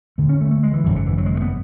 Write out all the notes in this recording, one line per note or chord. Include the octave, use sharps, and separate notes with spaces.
D2 D3 A3
C#4
A3
A3
G#3
E3
G#1 F#2 C#3 E3
D3
E3
F#3
G#3
A3
B3